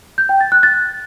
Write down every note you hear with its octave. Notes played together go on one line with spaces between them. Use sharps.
G6
G5
A6
F#6
A6